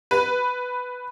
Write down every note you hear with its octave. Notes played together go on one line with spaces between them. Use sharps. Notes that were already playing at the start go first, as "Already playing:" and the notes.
B4